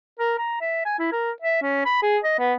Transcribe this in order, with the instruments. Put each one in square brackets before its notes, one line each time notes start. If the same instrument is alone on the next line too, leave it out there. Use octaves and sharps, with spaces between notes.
[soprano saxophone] A#4
A#5
E5
G#5
E4
A#4
E5
C#4
B5
G#4
D#5
B3